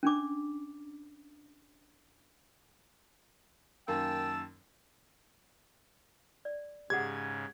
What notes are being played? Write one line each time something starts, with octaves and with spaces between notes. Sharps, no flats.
C#4 D4 D6
F#2 D#3 A#3 G5 A5 E6
D5
G#2 C#3 G4 G#4 F#5 G#6